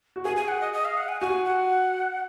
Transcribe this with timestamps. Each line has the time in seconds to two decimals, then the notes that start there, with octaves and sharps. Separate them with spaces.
0.16 F#4
0.25 G#4 G#5
0.36 G#5
0.48 F#5
0.61 D#5
0.73 D#5
0.85 F5
0.97 F#5
1.09 G#5
1.21 F#4 G#5
1.45 F#5